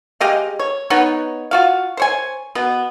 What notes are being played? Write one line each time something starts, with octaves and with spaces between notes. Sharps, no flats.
G#3 G4 D#5 F5
C#5
B3 D#4 B4 C#5
F4 F#4 F5
C5 C#5 G#5
B2 B3